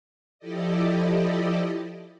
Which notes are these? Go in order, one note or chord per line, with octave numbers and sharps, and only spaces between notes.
F3 E4 G4 A4 D5 D#5